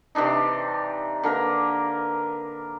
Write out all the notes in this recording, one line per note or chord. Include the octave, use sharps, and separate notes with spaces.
C3 E3 D4 D#4
D3 A#3 A#4 B4